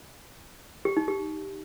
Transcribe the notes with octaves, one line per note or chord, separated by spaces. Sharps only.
G4
D#4
G4